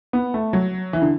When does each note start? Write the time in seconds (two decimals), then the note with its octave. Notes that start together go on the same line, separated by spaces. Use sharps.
0.13 B3
0.34 A3
0.53 F#3
0.93 E3
1.02 D3